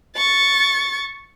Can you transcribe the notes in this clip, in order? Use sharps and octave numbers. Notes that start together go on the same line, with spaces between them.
C#6 A6